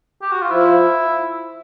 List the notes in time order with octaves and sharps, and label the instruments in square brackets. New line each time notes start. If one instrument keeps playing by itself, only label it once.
[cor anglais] G4
F#4
F4
[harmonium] F3 [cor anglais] E4